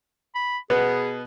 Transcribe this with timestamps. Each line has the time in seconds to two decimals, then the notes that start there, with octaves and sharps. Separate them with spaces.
0.35 B5
0.70 B2 B3 G#4